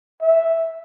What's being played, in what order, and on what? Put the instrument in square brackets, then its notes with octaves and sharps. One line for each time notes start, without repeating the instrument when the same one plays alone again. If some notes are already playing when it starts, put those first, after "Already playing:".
[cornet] E5